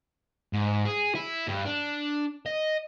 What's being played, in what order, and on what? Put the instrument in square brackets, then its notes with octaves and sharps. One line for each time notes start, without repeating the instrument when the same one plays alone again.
[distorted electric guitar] G#2
G#4
E4
G2
D4
D#5